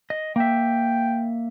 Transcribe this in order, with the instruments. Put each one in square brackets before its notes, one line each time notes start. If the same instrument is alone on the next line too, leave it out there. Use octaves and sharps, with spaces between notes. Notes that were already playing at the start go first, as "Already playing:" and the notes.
[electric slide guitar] D#5
[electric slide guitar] A#3 E5 [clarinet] G5